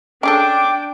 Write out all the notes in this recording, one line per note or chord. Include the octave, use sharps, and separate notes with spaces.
C#4 D4 G#4 A4 G5 D6